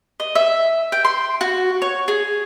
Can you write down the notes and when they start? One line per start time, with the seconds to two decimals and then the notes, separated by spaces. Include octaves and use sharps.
0.20 D#5
0.35 E5
0.92 G5
1.05 C6
1.41 F#4
1.82 C#5
2.08 G#4